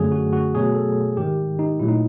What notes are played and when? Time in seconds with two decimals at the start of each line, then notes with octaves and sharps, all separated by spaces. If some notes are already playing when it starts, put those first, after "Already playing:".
Already playing: F#2 D3 F#3 A3 G#4
0.12 F#4
0.33 F#4
0.55 B2 F#3 A3 G#4
0.75 A4
1.17 G#2 D#3 G#3 G4
1.59 D#4
1.80 A#2 F#3 A3 E4
1.89 D#4